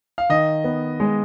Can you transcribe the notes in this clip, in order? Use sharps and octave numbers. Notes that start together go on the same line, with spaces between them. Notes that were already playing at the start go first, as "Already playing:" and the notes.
F5
D#3 D#5
B3
G#3